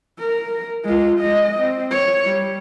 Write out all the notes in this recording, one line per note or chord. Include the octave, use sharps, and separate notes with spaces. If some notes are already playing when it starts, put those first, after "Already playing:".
A#4
G#3 F4
G#3 D#5
C4
C#5
G3